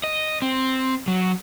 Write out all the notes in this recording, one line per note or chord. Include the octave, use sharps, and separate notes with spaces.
D#5
C4
F#3